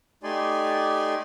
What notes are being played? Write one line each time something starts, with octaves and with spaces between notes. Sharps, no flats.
A3 D#4 G4 D5 G#5 C6